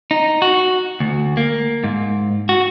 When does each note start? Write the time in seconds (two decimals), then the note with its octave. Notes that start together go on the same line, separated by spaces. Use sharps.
0.11 D#4
0.42 F#4
1.00 D2
1.37 A#3
1.84 G#2
2.49 F#4